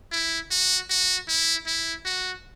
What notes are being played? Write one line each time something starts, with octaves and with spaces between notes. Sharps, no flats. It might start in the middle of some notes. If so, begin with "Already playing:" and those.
E4
F#4
F#4
E4
E4
F#4